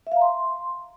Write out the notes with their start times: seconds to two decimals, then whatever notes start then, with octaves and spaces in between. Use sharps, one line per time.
0.07 E5
0.12 F5
0.17 A#5
0.22 C6